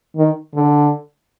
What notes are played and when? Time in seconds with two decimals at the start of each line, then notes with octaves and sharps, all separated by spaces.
0.16 D#3
0.54 D3